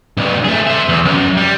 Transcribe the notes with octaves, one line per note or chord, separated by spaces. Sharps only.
B1 G2
A3 G#4
C5 E5
E2
F#2
G3